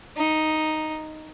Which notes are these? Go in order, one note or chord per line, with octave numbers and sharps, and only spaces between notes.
D#4